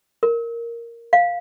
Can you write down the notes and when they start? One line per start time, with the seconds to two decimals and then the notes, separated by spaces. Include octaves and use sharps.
0.23 A#4
1.13 F5